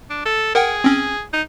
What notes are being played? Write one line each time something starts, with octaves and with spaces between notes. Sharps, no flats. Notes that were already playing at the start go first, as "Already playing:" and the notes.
D4
A4
G#4 A#4 F#5 G5
C4 C#4
D#4